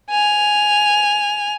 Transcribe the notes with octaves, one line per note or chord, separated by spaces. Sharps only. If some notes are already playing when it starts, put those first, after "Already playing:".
G#5 F7